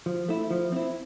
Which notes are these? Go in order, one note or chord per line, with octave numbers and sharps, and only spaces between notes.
F3
A3 E4
F3
C4 E4